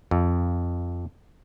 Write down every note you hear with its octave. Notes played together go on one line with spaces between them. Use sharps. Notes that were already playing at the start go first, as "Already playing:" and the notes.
F2